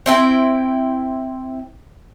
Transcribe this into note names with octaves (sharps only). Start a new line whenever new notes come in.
C4 E4 G5